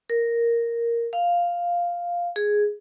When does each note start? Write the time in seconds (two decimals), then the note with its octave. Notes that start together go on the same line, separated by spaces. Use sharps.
0.10 A#4
1.13 F5
2.36 G#4